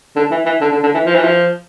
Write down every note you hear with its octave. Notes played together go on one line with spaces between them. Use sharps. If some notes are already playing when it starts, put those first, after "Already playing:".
D3
E3
E3
D3
D3
D3
E3
F3
E3
F3